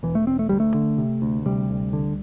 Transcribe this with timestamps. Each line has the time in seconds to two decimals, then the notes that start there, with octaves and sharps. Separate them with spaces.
0.03 E1 E3
0.15 A3
0.27 E1 C4
0.39 A3
0.49 D2 G3
0.60 A3
0.74 D3
0.98 C3
1.22 D2
1.46 C3 G3
1.69 D2
1.93 D3